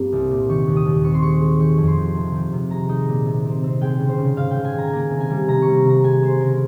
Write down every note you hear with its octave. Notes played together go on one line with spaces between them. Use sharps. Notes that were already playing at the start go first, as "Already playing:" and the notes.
Already playing: G2 A#3 C4
C2
A#2
D#3 C#6
D#2
D#6
D#2
C4 C#6
C6
G#3 C#6
G#3
D#3 C#6
F2
C6
D#3
C3
D#3
C3
G#3 A#5
D#4
A#2
C3
C4
C4
G#3 G5
C#3
C5
C#3
G#2 F5
G5
G#3
G#5
D#3 A#5
G#5
A#3 A#5
C3
G#5
G3
C3 A#5
G3 C#6
C3 A#5
G#3 G#5
G#3 C5
C#3 A#4